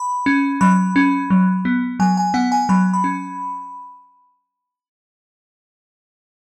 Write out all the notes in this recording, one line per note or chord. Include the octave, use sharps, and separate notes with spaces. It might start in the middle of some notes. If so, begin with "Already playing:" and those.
Already playing: B5
C#4
F#3 B5
C#4
F#3
B3
F#3 G#5
G#5
B3 F#5
G#5
F#3 B5
B5
C#4